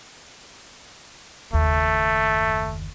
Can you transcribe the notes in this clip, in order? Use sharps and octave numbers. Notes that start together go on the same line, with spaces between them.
F#1 D#2 A3